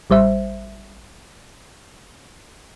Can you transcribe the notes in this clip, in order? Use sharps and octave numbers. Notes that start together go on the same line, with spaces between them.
A1 G3 C5 E5